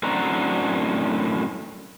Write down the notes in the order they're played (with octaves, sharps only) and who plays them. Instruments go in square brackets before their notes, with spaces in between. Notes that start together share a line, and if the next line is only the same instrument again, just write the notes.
[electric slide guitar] F#2 A2 C4 D4 F#4 A#5